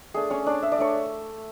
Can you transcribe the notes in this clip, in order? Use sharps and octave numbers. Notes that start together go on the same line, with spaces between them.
A3 D4 G#4
C#4 C#5
D4 D5
E5
D5
A3 D4 C#5